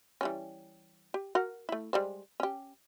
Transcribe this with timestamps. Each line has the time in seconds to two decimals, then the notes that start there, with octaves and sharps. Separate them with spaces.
0.21 E3 G3 C#4
1.14 G4
1.35 F#4 A#4 F#5
1.69 A3 E4
1.93 G3 G#3 C5
2.40 C#4 G4